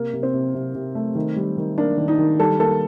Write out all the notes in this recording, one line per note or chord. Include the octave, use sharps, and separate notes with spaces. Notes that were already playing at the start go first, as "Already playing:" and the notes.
Already playing: C3 A#3
C3
C4
C3
C3
C3
A3
D#3
G3
D#3
A#3 D4
D#3
D#4
D#3
G3 A4
A#3 A4